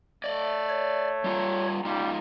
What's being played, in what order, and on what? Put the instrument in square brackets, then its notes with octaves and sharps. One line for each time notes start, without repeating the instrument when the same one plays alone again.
[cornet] A3 [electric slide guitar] D5 D#5
[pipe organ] C#5
[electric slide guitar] G3 F4 A#5
[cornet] G3 [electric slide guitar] G#3 D#4 F4